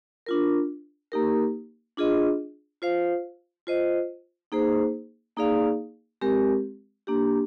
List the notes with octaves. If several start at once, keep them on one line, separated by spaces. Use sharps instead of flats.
D4 F4 A#4
A#3 D#4 G4 A#4
D4 F4 G#4 D#5
F4 C5 F5
F4 C5 D#5
A#3 D#4 G#4 C5
A#3 D#4 G#4 D5 F5
G#3 C4 G4 A#4
A#3 D4 G4